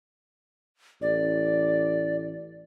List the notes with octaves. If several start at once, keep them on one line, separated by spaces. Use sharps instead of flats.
A1 D5